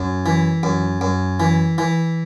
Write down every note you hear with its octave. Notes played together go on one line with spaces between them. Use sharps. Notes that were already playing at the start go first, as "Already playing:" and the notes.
Already playing: F#2
E3
F#2
F#2
E3
E3